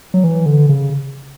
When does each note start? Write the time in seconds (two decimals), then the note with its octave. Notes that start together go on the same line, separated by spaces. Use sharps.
0.14 F#3
0.24 E3
0.46 D3
0.69 C#3